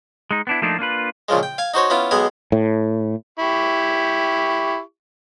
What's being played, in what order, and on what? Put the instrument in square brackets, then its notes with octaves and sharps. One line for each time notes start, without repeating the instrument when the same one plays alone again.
[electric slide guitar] G#3 D#4
B3 D4 E4
F3 A3 A#3 D4 D#4 F4
A#3 D4 F4 B4
[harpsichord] A#2 C#3 F3 G#3
G5
F5 G#5
D#4 F#4 C5 C#5
B3 C#4 E4 F4
B1 G#3 B3 G#4 G#5
[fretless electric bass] A2
[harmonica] E4 G4 C#6